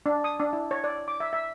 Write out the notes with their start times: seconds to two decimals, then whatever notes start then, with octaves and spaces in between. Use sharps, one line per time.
0.06 D4
0.24 D#6
0.40 D4
0.53 E4
0.71 C#5
0.84 D5
1.08 D6
1.20 E5
1.33 E5